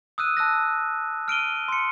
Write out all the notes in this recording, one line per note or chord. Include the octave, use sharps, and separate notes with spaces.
D#6 E6 F#6 D#7
A5 E6 F#6 A#6
F6 D7 D#7 G7
C6 C#7